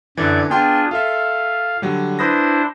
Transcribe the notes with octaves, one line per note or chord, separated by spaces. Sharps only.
F#2 D3 E3 D5 G#6
B3 D4 F4 G#4 G5 C6
F4 A4 E5 F5
D3 F#3 G3
D4 E4 B4 C5 D#6 A#6